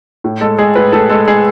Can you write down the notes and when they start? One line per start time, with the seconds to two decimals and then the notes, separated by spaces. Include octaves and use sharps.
0.24 A2
0.41 G#3 A4
0.59 G#3 G#4
0.75 A2 B4
0.92 A2 A4
1.09 G#3 A4
1.27 G#3 G#4